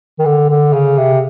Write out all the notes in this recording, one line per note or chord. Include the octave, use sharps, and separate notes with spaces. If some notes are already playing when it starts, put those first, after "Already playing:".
D#3
D3
D3
C#3
C3